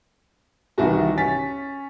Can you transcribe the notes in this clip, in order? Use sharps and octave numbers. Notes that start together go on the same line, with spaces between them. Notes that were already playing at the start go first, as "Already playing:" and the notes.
C2 D#3 E3 D4 F#4 A5
C#4 A6 B6